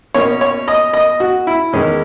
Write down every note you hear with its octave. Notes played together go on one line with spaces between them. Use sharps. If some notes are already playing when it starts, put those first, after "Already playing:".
B2 A#3 C#4 C#5
C#5
D#5
D#5
F#4
E4
E2 D#3 G#3 C#4